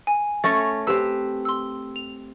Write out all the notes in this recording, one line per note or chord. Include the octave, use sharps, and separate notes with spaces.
G#5
A3 C#4 C#5 A6 A#6
C4 G4 B4 A5 E6
C6 E6
F7